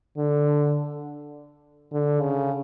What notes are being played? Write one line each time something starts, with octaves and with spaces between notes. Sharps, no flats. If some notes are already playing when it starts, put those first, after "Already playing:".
D3
D3
C#3